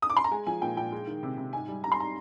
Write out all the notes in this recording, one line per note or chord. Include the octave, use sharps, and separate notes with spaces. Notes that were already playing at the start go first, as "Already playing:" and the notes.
D#6
D6
C6
A#5
G#3 G#5
F3 G#5
A#2 G5
A#2 G5
G#3
D#3
C3
C3
G#2 G#5
G3
G3 A#5
C6
A#5